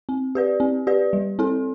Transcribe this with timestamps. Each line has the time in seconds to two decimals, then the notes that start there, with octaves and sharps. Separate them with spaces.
0.09 C4
0.35 G4 B4 D5
0.60 C4
0.87 G4 B4 D5
1.13 G3
1.39 C4 E4 A4